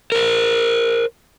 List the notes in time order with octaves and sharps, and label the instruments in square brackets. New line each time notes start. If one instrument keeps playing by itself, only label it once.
[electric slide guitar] A#4 C5